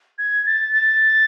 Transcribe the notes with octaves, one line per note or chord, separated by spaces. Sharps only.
G#6
A6
A6